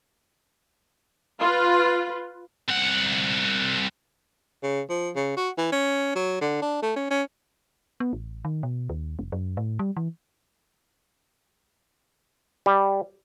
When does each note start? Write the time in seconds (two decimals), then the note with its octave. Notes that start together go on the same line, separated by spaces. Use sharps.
1.39 F4 B4
2.69 C2 F#5
4.63 C#3
4.90 F3
5.16 C#3
5.37 F#4
5.58 E3
5.72 C#4
6.15 F#3
6.41 D3
6.62 D4
6.82 A3
6.96 C#4
7.11 C#4
8.00 B3
8.13 A1
8.45 D#3
8.63 B2
8.89 D#2
9.19 F1
9.32 F#2
9.57 A2
9.79 G3
9.97 E3
12.66 G3